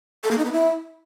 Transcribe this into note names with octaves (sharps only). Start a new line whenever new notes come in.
A4
A#3
D#4
B3
E4